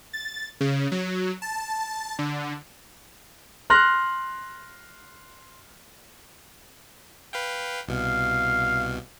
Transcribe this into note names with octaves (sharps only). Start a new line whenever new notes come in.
A6
C#3
F#3
A5
D3
C6 F6 F#6 A#6
B4 F5 G5
C2 B2 F5